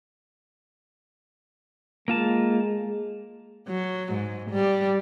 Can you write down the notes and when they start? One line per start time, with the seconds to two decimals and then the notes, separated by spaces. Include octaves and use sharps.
2.08 G#3 A#3 F4 A5
3.68 F#3
4.13 G#2
4.51 G3